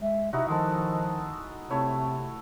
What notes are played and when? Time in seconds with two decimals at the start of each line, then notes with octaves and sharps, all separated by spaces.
0.01 G#3 E5
0.33 C3 D#4 E4 F#4 E5
0.48 D#3 F3 G#3 A4
1.70 C3 A3 C4 E4 C#5